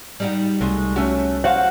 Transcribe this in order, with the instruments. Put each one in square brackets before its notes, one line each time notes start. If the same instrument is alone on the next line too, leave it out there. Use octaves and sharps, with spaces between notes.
[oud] G3 D#4 F#4
[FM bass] C2 [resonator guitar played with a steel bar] G#3 A3
[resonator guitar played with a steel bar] A3 F#4 [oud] C#4
[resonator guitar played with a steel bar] F#4 C5 F5 [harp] F#5